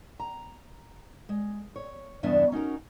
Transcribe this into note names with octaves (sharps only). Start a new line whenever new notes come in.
A#5
G#3
C#5
E2 G2 C#3 B3 D4 E5
C#4 D#4 F#4 A#4